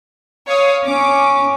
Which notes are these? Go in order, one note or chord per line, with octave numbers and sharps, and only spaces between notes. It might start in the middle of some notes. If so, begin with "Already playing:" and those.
C#5 F5 D#6
C#4 D6